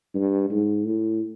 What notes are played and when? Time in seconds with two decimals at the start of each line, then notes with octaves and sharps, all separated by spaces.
0.14 G2
0.50 G#2
0.85 A2